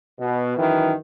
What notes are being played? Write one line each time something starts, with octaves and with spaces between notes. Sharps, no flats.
B2
F#2 D#3 E3